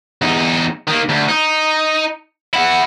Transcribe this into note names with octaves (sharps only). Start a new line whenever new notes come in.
E2 D#4
D#3 A#3
D2
D#4
E4 F#5